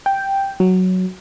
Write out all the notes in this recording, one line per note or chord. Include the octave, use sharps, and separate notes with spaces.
G5
F#3